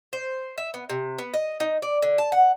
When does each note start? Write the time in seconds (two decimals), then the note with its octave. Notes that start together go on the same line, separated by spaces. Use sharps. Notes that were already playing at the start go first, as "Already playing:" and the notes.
0.13 C5
0.58 E5
0.74 B3
0.90 C3
1.19 B3
1.34 D#5
1.60 D#4
1.82 D5
2.02 D3
2.18 A5
2.32 F#5